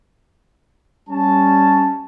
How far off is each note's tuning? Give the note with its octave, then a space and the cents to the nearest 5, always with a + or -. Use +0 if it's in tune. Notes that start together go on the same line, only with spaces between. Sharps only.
G3 +0 C#4 +0 A5 +0